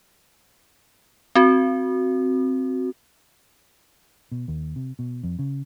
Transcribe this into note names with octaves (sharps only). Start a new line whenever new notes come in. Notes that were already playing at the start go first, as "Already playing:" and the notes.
C4 F#4
B2
D#2
C3
B2
F2
C#3